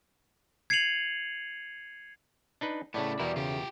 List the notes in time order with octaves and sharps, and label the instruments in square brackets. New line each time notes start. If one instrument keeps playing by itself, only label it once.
[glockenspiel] G#6 C7 C#7 D#7 F7 F#7
[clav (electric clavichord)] D4 D#4 B4
[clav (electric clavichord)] A2 C#3 [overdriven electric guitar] A3 B3 [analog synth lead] D5
[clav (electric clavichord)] E2 B2 A#4 [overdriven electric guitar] G3 E4
[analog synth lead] C#3 [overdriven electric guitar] F4 G4